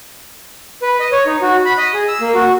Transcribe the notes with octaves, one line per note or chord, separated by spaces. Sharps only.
B4
D#5
C#5
D#4
F#4
B5
D#5
G#4
E6
A#3
F#4